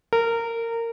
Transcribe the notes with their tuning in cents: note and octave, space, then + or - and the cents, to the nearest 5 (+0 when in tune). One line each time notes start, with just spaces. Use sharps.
A#4 -20